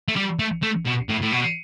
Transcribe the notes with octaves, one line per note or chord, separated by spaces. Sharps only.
A3
G3
A3
A3
B2
A2
A2
B2